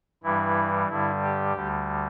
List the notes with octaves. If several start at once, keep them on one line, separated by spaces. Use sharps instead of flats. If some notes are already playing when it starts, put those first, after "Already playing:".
G2 E3 G3 E4
G2 D3 G3 E4
G4
D2 D3 G3